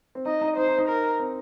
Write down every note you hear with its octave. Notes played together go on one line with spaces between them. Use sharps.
C4
D#4 D#5
D#4
D#4 C5
D#4
D#4
A#4
C4